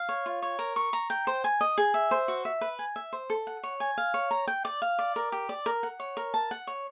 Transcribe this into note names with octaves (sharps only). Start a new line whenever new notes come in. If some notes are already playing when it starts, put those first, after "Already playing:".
Already playing: F5
C#5
F4
C#5
A#4
C#6
A#5
G5
C5
G#5
D#5
G#4
E5
C5
F#4
E5
B4
G#5
E5
C5
A4
F#5
C#5
G#5
F5
C#5
A#5
G5
D5
F5
D5
A#4
G4
D5
A#4
F#5
C#5
A#4
A5
F#5
C#5